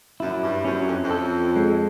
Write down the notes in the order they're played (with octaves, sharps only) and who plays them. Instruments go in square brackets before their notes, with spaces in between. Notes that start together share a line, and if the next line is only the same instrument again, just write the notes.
[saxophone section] F#2 [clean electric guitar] E4
[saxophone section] G2
[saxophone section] F#2 [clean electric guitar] C#4
[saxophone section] F2
F2
[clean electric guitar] A4
G#3